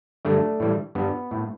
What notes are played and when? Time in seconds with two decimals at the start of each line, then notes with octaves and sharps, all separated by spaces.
0.25 G2 D3 G3 A3 D4
0.60 A2 E3 G3
0.95 G2 G3 B3
1.31 A2 A3